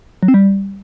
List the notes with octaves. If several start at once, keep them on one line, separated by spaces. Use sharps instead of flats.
F#3
C4
G3